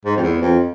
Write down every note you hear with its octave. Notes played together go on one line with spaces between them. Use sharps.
G#2
F2
E2
F2